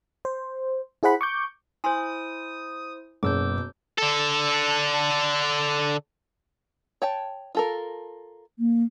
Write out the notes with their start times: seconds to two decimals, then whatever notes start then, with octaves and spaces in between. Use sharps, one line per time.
0.25 C5
1.03 E4 G#4 C5 F#5 B5
1.21 C#6 D6 G6
1.84 E4 C5 G#5 C6 D#6
3.23 F#1 B2 D6 E6 G6
3.98 D3 A4
7.02 C#5 G5 A5
7.55 F4 A4 A#4
8.59 A#3